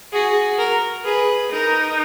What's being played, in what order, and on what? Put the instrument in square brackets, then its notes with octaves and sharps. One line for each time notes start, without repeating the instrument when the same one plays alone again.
[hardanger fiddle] F#4 [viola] G#4
[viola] A#4
[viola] G#4 [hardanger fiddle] B4
[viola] D#4 [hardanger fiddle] A#4